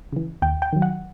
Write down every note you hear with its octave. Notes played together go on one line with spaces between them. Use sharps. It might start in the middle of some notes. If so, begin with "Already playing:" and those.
C#3 E3
D#2 G5
G5
D#3 F#3
F#5